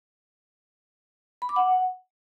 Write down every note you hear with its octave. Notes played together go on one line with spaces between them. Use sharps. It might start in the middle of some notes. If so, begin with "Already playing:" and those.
B5
D6
F#5